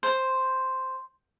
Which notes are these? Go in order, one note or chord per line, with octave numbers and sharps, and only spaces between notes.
C5